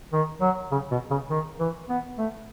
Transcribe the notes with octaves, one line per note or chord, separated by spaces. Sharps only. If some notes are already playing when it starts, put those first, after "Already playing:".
D#3
F#3
C#3
B2
C#3
D#3
E3
B3
A3